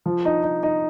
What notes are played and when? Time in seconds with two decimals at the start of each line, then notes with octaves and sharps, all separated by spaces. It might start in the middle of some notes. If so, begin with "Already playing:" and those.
0.06 F3
0.25 D#4
0.44 D#4
0.63 D#4